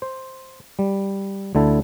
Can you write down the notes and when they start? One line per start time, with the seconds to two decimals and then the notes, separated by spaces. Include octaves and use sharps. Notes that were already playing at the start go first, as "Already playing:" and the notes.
0.02 C5
0.79 G3
1.55 D2 D3 E4 A4